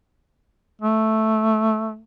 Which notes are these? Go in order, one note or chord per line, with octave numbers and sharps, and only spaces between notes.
A3